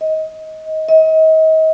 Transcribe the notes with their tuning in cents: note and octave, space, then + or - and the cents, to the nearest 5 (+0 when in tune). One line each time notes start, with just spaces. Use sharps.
D#5 +20
D#5 +35